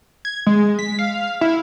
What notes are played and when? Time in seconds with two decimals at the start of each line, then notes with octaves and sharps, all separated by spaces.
0.25 G#6
0.47 G#3
0.79 B6
0.99 F5
1.41 E4